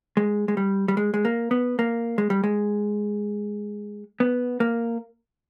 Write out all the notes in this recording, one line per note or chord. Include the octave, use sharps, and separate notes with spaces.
G#3
G#3
G3
G3
G#3
G#3
A#3
B3
A#3
G#3
G3
G#3
B3
A#3